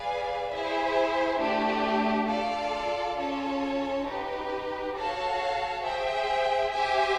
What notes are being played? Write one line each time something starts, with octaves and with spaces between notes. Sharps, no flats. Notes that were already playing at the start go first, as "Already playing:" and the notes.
Already playing: G#4 B4 D5 F5 G#5
E4 G#4 C5 E5
A3 D4 G4
F4 A4 D5 F5
C#4 F4 A4 C#5
D#4 G4 B4
F#4 A4 C#5 F5 A5
G#4 C5 E5 G5
G4 C5 E5 G#5